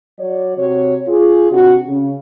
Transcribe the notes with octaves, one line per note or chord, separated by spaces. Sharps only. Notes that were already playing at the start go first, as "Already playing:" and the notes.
F#3 C#5 D5
C3 F#4 C#5
F4 G#4
C3 D4 F#4
C#3